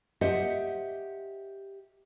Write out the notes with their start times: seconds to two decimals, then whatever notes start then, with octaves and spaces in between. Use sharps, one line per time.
0.21 G4 C5 D#5 E5 F#5